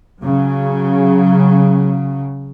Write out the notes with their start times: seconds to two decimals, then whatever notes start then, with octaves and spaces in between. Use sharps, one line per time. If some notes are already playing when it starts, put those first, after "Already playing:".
0.22 C#3 F#3